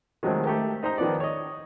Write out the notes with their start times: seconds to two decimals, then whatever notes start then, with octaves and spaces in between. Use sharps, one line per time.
0.23 D#3 F3 F#3 G#3 A3 C4
0.45 A3 G4 A#4
0.83 D#4 C5 D#5 A#5
0.98 D#3 F3 B3 D5
1.20 C#5 D#5